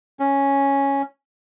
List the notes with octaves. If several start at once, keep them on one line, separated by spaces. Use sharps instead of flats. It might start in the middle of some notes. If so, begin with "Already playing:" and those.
C#4